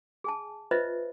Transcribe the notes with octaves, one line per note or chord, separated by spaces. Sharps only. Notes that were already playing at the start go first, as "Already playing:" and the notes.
G#4 G#5 A5
F4 B4 C5 D#5 E5